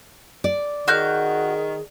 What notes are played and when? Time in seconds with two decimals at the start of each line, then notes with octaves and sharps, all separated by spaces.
0.44 D5
0.88 D#3 F#4 G#4 F6 G6